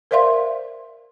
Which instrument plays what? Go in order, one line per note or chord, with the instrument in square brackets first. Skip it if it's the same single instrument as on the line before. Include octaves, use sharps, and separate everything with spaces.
[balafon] A#4 C5 D5 E5 F5 C6